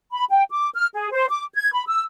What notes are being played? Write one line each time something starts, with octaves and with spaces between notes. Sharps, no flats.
B5
G5
D6
F6
G#4
C5
D6
G#6
B5
E6